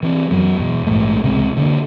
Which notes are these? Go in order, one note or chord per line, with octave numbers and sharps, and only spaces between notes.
E3 C4
F#2 F#3 B3
E2 B2
A#1 G#2 E3 A3
C#2 C3 G#3
D3 A3 A#3